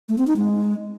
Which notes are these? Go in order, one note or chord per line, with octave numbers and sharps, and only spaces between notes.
A3
C4
D#4
G#3